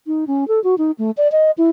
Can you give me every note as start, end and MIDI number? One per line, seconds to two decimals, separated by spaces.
0.07 0.25 63
0.27 0.47 61
0.48 0.62 69
0.64 0.75 66
0.78 0.91 63
0.99 1.11 57
1.17 1.30 74
1.32 1.51 75
1.58 1.70 64